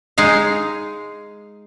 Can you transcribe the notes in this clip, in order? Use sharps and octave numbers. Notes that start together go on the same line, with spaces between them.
G#3 D#4 F5